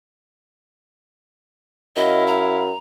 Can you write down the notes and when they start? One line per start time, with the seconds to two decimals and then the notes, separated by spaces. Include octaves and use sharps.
1.96 F#2 E4 D#5 F5
2.27 A#5